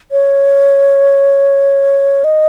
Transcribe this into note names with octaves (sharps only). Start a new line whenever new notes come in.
C#5
D#5